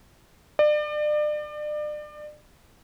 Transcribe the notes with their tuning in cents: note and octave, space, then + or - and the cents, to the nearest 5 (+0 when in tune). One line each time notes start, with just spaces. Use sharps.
D5 +35